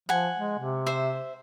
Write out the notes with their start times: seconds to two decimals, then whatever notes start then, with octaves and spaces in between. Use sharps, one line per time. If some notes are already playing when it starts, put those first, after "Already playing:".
0.09 F3 F#5 G#5
0.38 G#3
0.59 C3
0.86 C5 E5